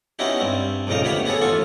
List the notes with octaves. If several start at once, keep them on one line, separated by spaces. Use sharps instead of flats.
B3 C#4 D#4 E4 F#4 G4
G2 C4
A#1 F2 A#2 C#3 D#4 F5
D2 B3 G4 C#5 B5
B3 F#4 G#4 A4 C#5
A1 D#2 F4 A4 C#6